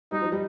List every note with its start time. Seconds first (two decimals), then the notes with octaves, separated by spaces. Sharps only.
0.12 G3 D#4
0.22 F3
0.32 G3